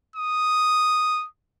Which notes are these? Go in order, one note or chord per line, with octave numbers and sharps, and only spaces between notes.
D#6